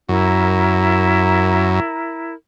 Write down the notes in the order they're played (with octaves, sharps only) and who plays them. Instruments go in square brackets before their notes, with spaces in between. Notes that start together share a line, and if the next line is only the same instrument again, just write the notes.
[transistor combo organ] F#2 [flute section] E4 A#4